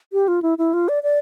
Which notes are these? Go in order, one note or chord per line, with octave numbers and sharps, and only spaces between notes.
G4
F4
E4
E4
F4
D5
D5